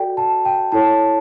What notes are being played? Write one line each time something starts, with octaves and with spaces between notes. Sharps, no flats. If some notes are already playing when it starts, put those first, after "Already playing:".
Already playing: F#4 A4 D5 G5
A5
G5
E4 A4 C#5 A5